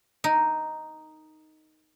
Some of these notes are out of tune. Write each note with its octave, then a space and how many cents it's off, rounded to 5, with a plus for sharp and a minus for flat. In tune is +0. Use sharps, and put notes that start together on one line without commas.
D#4 +0 A#4 +0